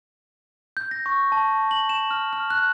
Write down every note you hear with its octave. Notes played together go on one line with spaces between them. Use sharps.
G6
A#6
C#6
A5
F#7
E7
F6
F6
F#6